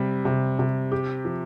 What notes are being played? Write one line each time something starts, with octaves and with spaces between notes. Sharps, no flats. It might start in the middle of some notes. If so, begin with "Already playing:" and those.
Already playing: C3 G3
C3
C3
G4
F3